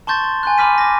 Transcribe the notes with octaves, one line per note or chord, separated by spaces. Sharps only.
A5 C6 C#6 G6 A6
C6
G#5 C6 F#6
B5 C6 D6 F6 B6 D#7
D6 A#6